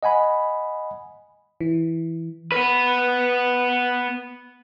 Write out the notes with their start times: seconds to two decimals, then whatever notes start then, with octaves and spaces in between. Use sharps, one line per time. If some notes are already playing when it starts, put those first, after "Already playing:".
0.03 D#5 F#5 G#5 B5
1.61 E3
2.52 B3 B4